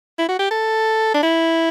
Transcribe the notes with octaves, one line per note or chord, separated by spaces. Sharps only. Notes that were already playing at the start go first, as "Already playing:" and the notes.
E4
F#4
G4
A4
D4
E4